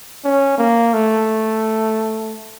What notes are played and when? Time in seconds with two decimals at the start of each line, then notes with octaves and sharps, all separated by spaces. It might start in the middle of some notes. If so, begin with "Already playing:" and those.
0.25 C#4
0.58 A#3
0.94 A3